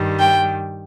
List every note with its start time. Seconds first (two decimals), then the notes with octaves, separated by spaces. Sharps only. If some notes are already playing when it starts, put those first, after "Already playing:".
Already playing: G2 D#3 G3
0.19 G5